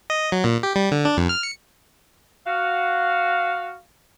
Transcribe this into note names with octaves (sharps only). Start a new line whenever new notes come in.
D#5
F#3
A#2
G4
G3
D3
D4
F2
F6
C#7
F#4 F5